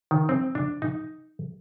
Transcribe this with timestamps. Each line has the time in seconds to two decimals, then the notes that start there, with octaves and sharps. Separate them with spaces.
0.11 D#3
0.29 C4
0.55 D4
0.82 D#4